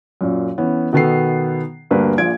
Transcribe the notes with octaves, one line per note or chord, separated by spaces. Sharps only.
F#2 A#2
E3 B3 C#4
B2 D#3 B3 A4 C7
D2 G2 A#3 B4
A#1 A#2 F4 G#6 D7